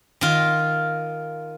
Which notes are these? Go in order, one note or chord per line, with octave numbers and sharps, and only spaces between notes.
D#3 F4